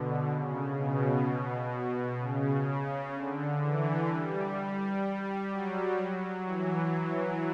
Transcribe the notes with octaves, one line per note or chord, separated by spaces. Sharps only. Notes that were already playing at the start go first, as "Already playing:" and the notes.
Already playing: B2 D3
C#3
B2
C#3
C#3
D3
E3
G3
G3
F#3
E3